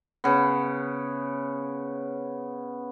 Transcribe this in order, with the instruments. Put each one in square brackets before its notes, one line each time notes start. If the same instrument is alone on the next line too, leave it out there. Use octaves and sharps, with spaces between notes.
[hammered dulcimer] C#3 B3